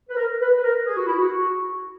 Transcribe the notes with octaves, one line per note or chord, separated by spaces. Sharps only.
B4
A#4
B4
B4
A#4
G#4
F#4
E4
F#4